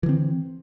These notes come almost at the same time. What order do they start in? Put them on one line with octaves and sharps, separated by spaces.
E3 D3 C4